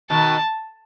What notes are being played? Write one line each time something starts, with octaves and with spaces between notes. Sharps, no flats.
B2 D#3 A5